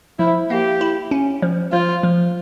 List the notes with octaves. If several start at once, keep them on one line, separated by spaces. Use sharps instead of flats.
F3 E4
A#3 G4
E4
C#4
F3
F3 F4
F3